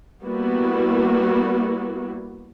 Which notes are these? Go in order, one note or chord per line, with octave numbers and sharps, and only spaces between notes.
G3 A#3 B3 E4 F#4